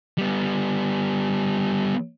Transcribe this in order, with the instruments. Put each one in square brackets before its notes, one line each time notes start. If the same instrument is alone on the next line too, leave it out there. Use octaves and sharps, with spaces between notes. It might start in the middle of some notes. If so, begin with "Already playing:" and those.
[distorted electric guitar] G3 B3